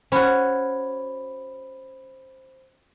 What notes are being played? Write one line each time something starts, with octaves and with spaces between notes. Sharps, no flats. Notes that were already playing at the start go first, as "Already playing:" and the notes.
C#4 F#4 C5 B5